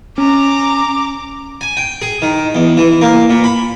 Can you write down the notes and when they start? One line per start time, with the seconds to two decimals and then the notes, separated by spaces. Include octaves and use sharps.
0.18 C#4 A#5 D6
1.61 G#5
1.77 G5
2.02 G#4
2.22 D#3
2.55 E2
2.77 E3
3.01 A#3
3.30 A#2
3.44 B5